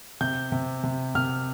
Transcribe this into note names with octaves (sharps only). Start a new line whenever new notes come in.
C3 G6
C3
C3
C3 F6